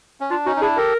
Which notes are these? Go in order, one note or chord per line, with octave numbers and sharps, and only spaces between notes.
C#4
D4 F4
C#4 D#4 F#4
D#4
D4 E4 G#4
G4 A4 A#4